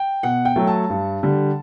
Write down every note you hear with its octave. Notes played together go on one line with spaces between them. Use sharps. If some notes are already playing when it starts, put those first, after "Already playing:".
Already playing: G5
B2 F#5
G5
F#3 A3
A5
G2
D3 G3